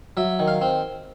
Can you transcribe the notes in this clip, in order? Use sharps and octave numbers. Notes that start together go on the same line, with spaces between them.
F#3 E5
D#3
F5
C4